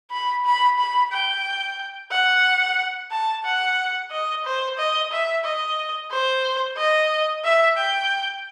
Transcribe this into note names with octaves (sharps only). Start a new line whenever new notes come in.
B5
B5
B5
G5
F#5
A5
F#5
D#5
C5
D#5
E5
D#5
C5
D#5
E5
G5